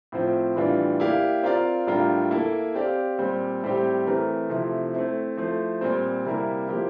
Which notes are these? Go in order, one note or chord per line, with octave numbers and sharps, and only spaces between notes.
A2 F3 C4 F4
A2 E3 G3 D4 F4
A#3 E4 G4 D5 F5
C4 F4 A#4 D5 F5
A2 G3 D4 F4 A#4
A#3 E4 A4
C4 G4 D5 F5
A#2 G3 C4
A2 G3 C4 G4
E3 A3 C4 E4 A#4
C3 F3 A3 E4
A3 C4 E4
F3 A3 E4 A4 C5
A#2 G3 C4
C3 G3 A#3 E4 A#4
F3 A#3 E4 G4